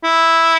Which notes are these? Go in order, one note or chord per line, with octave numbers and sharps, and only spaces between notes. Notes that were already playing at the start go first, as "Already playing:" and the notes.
E4